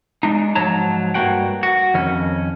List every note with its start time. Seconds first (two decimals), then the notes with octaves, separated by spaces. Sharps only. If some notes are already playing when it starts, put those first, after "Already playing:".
0.23 G#3 D4 D#4
0.55 G#2 F3 F#3 C#5 A5 A#5
1.14 G2 E3 A#3 F#4 F#5 G5
1.63 F#4
1.94 F2 D#3 C#4